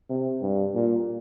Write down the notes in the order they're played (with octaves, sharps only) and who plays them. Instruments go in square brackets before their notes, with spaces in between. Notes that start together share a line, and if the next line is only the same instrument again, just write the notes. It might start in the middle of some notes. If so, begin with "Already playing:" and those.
[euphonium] C3
G2
A#2